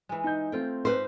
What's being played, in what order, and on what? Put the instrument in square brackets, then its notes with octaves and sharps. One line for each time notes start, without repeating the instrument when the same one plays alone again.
[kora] E3 G#3
[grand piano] D#4 G6
[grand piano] A3 C4 [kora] F4 G5
[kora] G#2 D#4 G4 [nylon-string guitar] B4 C5